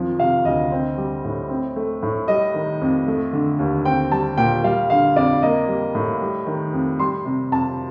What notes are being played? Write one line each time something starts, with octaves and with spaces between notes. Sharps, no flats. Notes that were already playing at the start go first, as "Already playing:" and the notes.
Already playing: F2 D#3 F3
C3 F5
D2 D#5
C4
G3
A2
C4
A3
A2
G3 D#5
D#3
F2
A3
D3
D#2
C4 G5
G3 A5
A#2 G5
G3 F5
D3 F5
F2 D5
A#3 D#5
G3
A2
G3
D#3
F2
G3 C6
C3
F2 A5